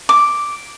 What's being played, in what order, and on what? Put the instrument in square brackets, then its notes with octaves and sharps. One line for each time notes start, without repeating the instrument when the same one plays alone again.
[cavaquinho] D6